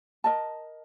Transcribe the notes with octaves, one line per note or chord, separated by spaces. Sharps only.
A#4 D#5 A5